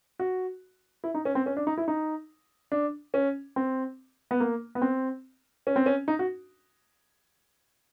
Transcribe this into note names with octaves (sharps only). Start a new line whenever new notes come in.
F#4
E4
D#4
C#4
C4
C#4
D4
D#4
E4
D#4
D4
C#4
C4
B3
A#3
B3
C4
C#4
C4
C#4
D#4
F#4